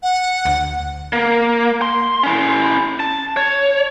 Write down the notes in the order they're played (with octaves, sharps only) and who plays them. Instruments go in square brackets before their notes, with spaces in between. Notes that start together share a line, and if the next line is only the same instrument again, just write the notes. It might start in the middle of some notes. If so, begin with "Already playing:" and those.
[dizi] F#5
[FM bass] D2
[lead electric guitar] A#3
C6
C#4 E4
A5
C#5